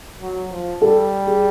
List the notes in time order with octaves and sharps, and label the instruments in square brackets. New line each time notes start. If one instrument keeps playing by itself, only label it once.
[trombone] F#3
F3
[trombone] G3 [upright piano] A4
[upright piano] G#4